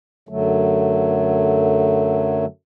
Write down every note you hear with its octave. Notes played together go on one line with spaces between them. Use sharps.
F#2 D3 F#3 A3